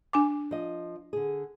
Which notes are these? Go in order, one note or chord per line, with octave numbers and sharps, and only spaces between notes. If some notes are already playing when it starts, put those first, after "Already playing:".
D4 G#5 D6
F3 D#5
D3 G#4